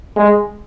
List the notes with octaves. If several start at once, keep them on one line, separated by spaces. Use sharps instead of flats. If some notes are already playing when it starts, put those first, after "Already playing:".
G#3